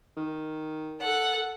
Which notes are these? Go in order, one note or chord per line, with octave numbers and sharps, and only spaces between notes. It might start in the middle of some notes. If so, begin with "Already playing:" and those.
D#3
A4 F#5